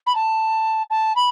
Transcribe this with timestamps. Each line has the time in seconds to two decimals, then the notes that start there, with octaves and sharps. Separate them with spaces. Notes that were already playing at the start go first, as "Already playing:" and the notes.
0.06 B5
0.15 A5
0.90 A5
1.16 B5